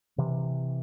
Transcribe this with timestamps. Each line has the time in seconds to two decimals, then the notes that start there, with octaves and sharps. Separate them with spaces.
0.18 C3 E3